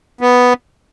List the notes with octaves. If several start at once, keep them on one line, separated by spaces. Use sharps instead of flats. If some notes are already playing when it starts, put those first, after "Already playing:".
B3